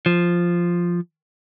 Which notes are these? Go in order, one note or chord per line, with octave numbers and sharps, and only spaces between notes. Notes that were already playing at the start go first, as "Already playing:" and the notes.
F3